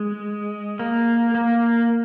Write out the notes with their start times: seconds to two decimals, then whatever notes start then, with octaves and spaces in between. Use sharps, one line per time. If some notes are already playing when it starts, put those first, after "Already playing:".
Already playing: G#3
0.79 A#3
1.35 A#3